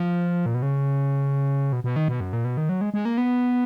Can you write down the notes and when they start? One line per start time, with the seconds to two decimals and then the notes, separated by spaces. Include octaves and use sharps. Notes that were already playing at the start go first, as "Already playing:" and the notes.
Already playing: F3
0.46 A#2
0.54 B2
0.62 C#3
1.73 B2
1.84 B2
1.96 D#3
2.08 B2
2.20 F#2
2.33 A#2
2.45 B2
2.57 D#3
2.69 F#3
2.81 G#3
2.94 G#3
3.05 A#3
3.18 B3